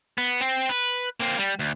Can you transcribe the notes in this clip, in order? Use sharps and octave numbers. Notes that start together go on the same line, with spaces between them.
B3
C4
B4
A#3 C4
G3
D2